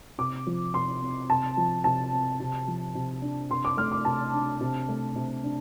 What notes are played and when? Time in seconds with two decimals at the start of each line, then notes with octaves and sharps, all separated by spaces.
0.18 C3 D6
0.47 F3
0.74 C3 C6
1.02 C4
1.30 C3 A5
1.57 F3
1.84 C3 A5
2.12 C4
2.40 C3
2.68 F3
2.95 C3
3.22 D4
3.50 C3 C6
3.65 D6
3.77 A3 F6
3.91 D6
4.05 C3 A5
4.34 D4
4.61 C3
4.88 A3
5.16 C3
5.43 D4